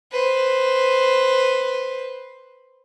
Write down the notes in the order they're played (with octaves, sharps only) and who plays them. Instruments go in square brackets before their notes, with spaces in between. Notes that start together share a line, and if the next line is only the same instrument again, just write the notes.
[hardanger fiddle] B4 C5